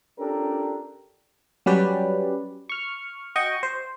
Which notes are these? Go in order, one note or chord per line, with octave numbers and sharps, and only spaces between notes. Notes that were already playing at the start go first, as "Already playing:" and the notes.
C#4 D4 F4 G4 A4 A#4
F#3 G3 C#4 G4 B4 D5
C#6 F6
F#4 D#5 G5 C#6
C5